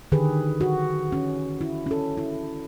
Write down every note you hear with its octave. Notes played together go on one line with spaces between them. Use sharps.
D3 D#3 G4 G#4 B4
F#4
C#4
E4
C#4 A4
E4